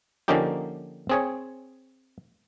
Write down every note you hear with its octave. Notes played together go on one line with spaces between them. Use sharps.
D3 F3 A#3 C#4 D#4 G4
C4 G#4 C#5